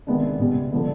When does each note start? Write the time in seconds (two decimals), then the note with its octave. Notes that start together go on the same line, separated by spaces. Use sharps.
0.07 C3 D#3 G#3 B3 D4
0.39 C#2 B2 G3 B3
0.72 D3 F3 G#3 B3